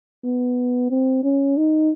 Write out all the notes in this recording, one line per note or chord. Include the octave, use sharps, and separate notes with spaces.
B3
C4
C#4
D#4